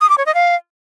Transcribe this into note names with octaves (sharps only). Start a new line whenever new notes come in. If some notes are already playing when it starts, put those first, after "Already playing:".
D#6
D6
C#5
D#5
F5